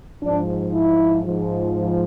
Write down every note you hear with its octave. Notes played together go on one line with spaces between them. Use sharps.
G#2 F3 D4
E4
G#2 F3